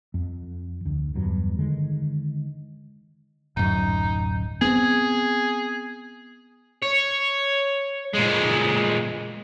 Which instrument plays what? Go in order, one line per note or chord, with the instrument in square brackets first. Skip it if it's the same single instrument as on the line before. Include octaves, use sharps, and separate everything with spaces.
[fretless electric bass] F2
D2
E2 G2 F#3
D3 D#3 G#3
[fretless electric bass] D1 F#2 [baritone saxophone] D#4
[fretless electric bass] B3 C4 [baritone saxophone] G#4
[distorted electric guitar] C#5
A#2 G#3